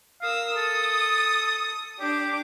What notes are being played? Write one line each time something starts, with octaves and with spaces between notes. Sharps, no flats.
A#4 F5 D#6 E6
A4 D#6
D4 G4 D6